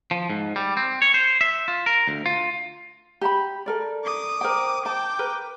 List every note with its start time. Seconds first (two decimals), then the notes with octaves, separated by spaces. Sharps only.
0.11 F3
0.30 G#2
0.56 G3
0.77 C4
1.02 C#5
1.14 C5
1.41 E5
1.68 F4
1.86 A#4
2.08 D2
2.26 F4
3.21 G4 A5 B5
3.66 A4 A#4 D5
4.04 D6 D#6
4.41 A#4 C5 G5
4.86 G5 A5 D6
5.19 A#4 B4